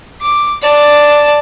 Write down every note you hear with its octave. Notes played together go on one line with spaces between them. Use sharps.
D6
D5 A5